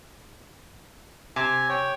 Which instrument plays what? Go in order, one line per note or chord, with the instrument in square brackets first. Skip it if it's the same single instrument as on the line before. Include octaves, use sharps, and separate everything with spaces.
[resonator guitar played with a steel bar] C3 [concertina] G#5
[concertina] C#5 G5